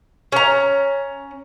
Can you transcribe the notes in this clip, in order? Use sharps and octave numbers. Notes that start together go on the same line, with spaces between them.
C#4 A#5